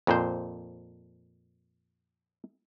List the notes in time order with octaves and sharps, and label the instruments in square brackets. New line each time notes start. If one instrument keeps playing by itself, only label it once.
[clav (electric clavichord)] F2 A#2 C5